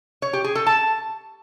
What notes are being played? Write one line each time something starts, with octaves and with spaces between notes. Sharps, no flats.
C#5
G4
G#4
A4
A5